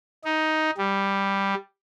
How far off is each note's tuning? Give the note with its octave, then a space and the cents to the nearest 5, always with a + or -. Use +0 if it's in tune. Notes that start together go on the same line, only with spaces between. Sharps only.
D#4 +10
G3 +5